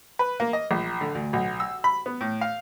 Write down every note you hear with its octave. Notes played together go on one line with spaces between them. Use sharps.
B4
A#3
D#5
A#1
D3
D2
B1
E6
B5
B3
A2
F5